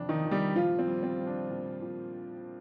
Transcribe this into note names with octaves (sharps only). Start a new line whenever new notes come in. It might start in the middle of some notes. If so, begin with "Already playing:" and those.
Already playing: F2 C3 F3 D4
D#3 D#4
F2
G3 G4
A#2 F3 F4
C4
G3
C4
G3
D4
A#2
A#2